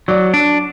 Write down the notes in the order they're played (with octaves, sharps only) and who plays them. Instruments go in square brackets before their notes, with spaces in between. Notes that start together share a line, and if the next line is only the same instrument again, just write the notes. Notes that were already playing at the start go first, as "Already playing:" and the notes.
[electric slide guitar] F#3 [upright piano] D5
[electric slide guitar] D4